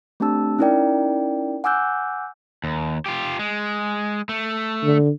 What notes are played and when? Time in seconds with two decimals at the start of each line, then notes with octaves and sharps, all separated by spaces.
0.20 A3 C4 D4 G4 A5 E6
0.59 C#4 D#4 E4 A#4 D5 G5
1.64 F#5 G#5 D6 E6 F#6 G6
2.64 D#2
3.06 F4 G4
3.39 G#3
4.29 A3
4.84 D3